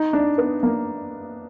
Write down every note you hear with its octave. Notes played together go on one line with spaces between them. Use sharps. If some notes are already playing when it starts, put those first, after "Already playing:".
Already playing: D#4
D4
B3
A#3